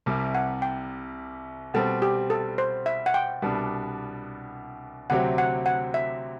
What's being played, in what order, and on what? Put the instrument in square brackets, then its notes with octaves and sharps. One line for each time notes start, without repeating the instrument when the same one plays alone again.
[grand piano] C2 C3 G3
[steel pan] F#5
G5
[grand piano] B2 G3 C4 [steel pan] A4
[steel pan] G4
A4
C5
E5
F#5
G5
[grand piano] C2 B2 G3 B3 D4
[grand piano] D2 C3 F#3 C4 G4 [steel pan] F#5
[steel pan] F#5
F#5
E5